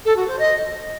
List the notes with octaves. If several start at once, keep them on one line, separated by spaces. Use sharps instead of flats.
A4
F#4
C5
D#5